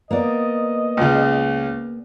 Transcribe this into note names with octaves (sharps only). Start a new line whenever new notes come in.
A#3 B3 D5 D#5
C#2 C#3